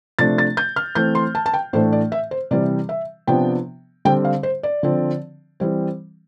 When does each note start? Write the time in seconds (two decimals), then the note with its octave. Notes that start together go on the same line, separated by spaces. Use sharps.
0.19 C3 F3 A3 D4 A6
0.38 A6
0.57 G6
0.76 F6
0.95 E3 A3 C4 G6
1.15 C6
1.35 A5
1.46 A5
1.54 G5
1.73 A2 E3 A3 D4 C5
1.93 D5
2.12 E5
2.31 C5
2.51 C3 E3 G3 D5
2.89 E5
3.27 C3 F3 B3 D4 G5
4.05 D3 G3 C4 G5
4.25 F5
4.43 C5
4.63 D5
4.83 D3 F3 C4
5.60 E3 G3 C4